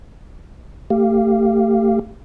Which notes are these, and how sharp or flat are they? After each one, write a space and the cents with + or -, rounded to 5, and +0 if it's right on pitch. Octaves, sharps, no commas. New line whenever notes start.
A3 +30 G4 +0 F5 -15